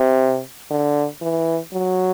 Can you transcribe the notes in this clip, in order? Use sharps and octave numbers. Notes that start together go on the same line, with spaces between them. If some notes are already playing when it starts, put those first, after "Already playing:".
Already playing: C3
D3
E3
F#3